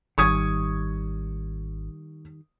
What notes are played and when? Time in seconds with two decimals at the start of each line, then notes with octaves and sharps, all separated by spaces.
0.18 G#1 D#3 G3 C#6 D#6 G#6